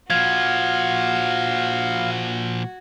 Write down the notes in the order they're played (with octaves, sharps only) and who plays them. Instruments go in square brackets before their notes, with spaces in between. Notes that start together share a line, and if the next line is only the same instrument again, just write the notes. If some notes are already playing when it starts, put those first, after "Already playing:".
[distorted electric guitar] A#2 F3 [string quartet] F#4 [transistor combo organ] F5 [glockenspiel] G#6